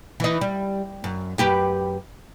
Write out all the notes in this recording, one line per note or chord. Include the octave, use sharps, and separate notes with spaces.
E3 D#4
G3
F#2
F#2 G4 B4